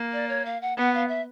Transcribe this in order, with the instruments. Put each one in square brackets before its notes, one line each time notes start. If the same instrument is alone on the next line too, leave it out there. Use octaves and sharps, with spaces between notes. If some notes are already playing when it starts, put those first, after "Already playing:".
Already playing: [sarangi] A#3
[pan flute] D5
C#5
F5
F#5
[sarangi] B3 [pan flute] F#5
[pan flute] F5
E5